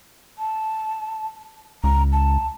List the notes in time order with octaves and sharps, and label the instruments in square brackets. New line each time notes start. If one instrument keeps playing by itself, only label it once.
[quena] A5
[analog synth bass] C#2 [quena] A#5
[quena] A5